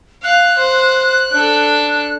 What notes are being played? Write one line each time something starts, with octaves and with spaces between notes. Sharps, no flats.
F5 F#6
C5
D4 A4